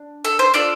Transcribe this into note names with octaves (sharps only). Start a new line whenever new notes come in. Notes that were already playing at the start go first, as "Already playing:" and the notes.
Already playing: D4
A4
C5
D4 F4 A4 D5